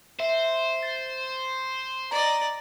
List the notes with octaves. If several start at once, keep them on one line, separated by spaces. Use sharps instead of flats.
C5 E5
A6
D5 D#5 A#5